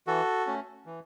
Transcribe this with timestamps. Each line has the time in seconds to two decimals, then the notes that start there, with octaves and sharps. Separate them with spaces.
0.07 E3 F#4 A4
0.47 A3 C#4
0.86 E3